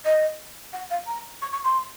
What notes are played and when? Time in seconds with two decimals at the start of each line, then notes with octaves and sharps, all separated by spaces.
0.05 D#5
0.73 F#5
0.90 F5
1.07 A#5
1.42 C#6
1.53 C#6
1.64 C6